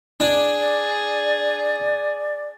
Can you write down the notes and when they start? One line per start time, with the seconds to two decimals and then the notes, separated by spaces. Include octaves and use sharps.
0.20 D4 G#4
0.60 D5